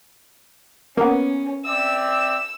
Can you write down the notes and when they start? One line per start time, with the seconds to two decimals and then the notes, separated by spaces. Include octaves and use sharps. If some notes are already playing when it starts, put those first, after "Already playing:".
0.97 A#3 B3 C#4
1.66 C4 D5 E5 E6